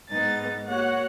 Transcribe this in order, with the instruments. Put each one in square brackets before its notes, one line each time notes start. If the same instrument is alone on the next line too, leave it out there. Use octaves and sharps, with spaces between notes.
[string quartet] G#2 G#3 B3 D#4 A6
A#3 F#4 C#5 F#5